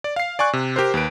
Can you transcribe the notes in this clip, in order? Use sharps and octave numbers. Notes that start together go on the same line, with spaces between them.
D5
F5 C7
D5 G#5 C#6 F#6
C3
G4 A#4 C5
D#2 B4 D7